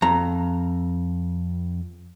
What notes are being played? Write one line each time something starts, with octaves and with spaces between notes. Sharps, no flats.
F2 A#5